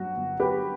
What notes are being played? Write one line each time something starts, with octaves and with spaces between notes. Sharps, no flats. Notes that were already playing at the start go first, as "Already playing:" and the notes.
Already playing: G2 F#3 F#4
G1
F#3 G4 B4